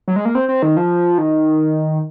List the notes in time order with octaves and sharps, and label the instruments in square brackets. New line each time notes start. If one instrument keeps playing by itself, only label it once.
[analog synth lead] F#3
G#3
A#3
C4
C4
D#3
F3
D#3